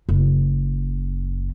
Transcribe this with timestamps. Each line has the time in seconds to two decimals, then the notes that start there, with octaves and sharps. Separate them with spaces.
0.09 F#1